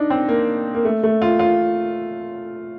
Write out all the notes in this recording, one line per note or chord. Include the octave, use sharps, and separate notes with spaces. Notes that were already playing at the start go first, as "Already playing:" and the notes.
Already playing: D4 D#4
C4
A#3
A#3
A3
A3
F4
F4